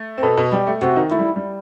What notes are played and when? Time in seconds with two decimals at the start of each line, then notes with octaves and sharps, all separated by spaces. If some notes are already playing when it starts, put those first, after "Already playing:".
Already playing: A3
0.18 C4
0.22 B2 B3 A4
0.37 B2 B3
0.52 G3 G4
0.67 A3
0.81 C3 C4 F#4
0.96 D#3 D#4
1.11 A3 E4
1.19 G3
1.36 G3